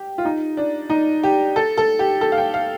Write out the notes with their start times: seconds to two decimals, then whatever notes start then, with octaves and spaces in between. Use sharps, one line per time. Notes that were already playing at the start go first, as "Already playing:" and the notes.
Already playing: G4
0.18 F4
0.25 D#4
0.57 D4
0.90 D#4
1.23 G4
1.56 A4
1.77 A4
1.99 G4
2.21 A4
2.32 F5
2.38 G5
2.54 F5